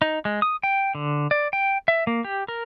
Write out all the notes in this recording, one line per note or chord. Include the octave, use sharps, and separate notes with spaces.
D#4
G#3
D#6
G5
D3
D5
G5
E5
A#3
G4
A#4